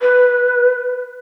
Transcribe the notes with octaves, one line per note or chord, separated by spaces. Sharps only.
B4